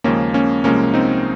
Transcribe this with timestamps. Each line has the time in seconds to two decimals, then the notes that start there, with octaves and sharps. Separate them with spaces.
0.04 D#2 C#3 F3 G#3 A#3 C#4
0.34 A#3 C#4
0.64 C2 C3 F3 G#3 A#3 C#4
0.94 C4 D#4